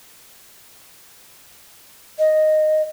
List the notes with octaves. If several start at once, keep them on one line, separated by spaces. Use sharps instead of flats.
D#5